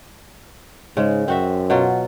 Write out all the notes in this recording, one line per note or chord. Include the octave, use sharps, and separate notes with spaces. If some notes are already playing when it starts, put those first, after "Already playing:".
G#2 C#3 G#3
F#2 C4 F#4 E5
B2 F#3 F4